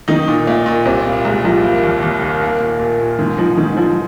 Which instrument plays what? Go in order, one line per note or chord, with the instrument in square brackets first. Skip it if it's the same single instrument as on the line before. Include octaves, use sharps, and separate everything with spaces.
[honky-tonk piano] D#3 [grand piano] D#4
[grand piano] A#2
[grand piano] A#2 [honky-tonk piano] A#3
[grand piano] A#2
[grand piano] C2 [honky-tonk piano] C4
[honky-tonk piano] A#3 [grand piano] F4
[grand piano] C2 [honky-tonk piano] G#3
[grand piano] C2 [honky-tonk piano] F3
[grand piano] A#3
D#2
D#2
D#3
A#3
A#2
A#2
A#2
[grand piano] G#2 [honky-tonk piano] D#3
[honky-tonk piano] F3 [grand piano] D#4
[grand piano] G#2 [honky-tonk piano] D#3
[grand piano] G#2 [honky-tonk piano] F3